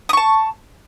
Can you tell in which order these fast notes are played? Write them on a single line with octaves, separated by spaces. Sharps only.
D#6 C#6 A5